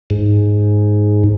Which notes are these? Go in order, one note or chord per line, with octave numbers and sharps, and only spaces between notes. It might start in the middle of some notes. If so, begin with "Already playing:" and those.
G#2